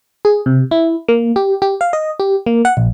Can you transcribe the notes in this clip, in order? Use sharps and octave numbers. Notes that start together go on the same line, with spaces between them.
G#4
C3
E4
A#3
G4
G4
F5
D#5
G4
A#3
F#5
A#1